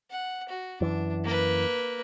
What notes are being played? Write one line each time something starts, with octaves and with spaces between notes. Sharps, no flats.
F#5
F#4
F#2 E3 D4
A#3 B4